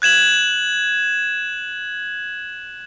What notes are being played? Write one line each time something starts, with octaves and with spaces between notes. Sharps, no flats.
F#6 G#6 E7 F#7